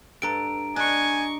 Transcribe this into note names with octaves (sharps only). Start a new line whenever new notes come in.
G2 A4 A#5 D7
D4 D#5 G#5 C#6